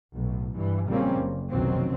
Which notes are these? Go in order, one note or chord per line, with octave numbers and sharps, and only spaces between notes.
B1 A2
G2 E3
A#1 C#3 G3 A#3 C4 C#4
F#1
F1 B1 D#3 F#3 C4 C#4